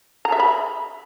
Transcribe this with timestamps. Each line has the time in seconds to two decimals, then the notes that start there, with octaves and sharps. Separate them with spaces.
0.25 A#5
0.32 E5
0.40 B5